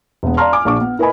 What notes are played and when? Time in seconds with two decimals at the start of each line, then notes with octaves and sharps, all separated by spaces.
0.23 E1 B3
0.37 D5 F5 A5 A#5 C6 F6
0.53 G#5 D6
0.65 A#1 D4 C#6 D6
0.81 B3
0.99 E4 A#4 B4 D#5 G#5 B5